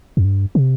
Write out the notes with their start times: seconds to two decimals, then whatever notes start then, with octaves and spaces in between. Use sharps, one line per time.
0.17 F2
0.24 G2
0.55 C3